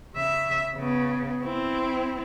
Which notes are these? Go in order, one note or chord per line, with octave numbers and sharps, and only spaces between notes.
C#3 E5
C#3 B3
C4 E4